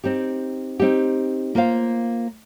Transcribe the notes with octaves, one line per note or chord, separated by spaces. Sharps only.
C4 D#4 G4
C4 D#4 G4
A#3 F4 C5 F5